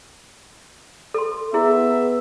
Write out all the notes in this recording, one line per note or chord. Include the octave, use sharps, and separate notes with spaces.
A4 C6
B3 E4 G#4 E5